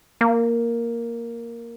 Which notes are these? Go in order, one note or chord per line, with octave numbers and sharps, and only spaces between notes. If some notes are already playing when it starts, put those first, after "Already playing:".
A#3